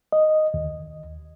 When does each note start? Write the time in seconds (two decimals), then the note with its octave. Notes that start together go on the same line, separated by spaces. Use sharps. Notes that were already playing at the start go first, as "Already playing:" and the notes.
0.12 D#5
0.54 D#2